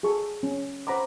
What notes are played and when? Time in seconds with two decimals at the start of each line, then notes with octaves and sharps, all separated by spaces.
0.03 G#4 A4 C#6
0.43 C#4
0.87 C5 F#5 A#5 B5 D6